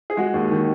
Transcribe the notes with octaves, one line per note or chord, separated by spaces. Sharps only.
G#4
G#3 F#4
D#2
D#3